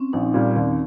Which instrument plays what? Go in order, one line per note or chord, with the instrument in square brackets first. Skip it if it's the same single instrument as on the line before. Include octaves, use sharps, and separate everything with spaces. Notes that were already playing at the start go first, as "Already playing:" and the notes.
Already playing: [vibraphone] C4 C#4
[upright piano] A#1 [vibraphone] D#4
[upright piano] A#2 G3
D#2